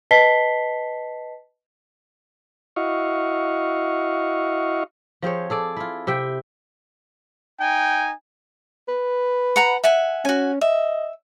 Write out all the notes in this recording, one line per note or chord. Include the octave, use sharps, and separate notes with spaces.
B4 D#5 A5 B6 C7 G7
E4 F#4 D#5 F5 C#6
F3 C4 G#4 C#5
G#4 A4 D5
E4 F4
C3 E5 G5
D#4 G5 G#5
B4
F#5 A#5 B5
E5 F#5 G#5
C#4 F#4 G#5
D#5 E5